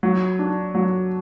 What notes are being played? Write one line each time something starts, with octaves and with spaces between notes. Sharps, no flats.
F#3
D4
F#3